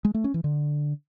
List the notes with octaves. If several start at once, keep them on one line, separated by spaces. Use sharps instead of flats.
G#3
A3
C#4
E3
D3